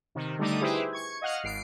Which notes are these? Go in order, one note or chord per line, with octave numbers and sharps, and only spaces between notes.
C3 D#3
D3 G3 A3 D#4 D6 D#6
E4 G4 G#4 B4 C5 E5
C#6 G#6
D#5 F5 F#5 F6
G#1 C7 D7